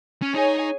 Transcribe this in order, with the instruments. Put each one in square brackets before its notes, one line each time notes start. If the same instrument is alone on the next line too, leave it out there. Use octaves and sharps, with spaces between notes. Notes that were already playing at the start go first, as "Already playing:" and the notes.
[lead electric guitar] C#4
[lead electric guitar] D#4 [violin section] G#4 C#5 G#5